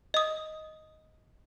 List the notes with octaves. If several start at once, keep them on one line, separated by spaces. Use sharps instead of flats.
D#5 D#6